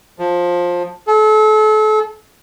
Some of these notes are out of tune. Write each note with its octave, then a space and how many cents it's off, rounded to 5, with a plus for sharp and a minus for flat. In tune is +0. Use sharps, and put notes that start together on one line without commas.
F3 +15
A4 -35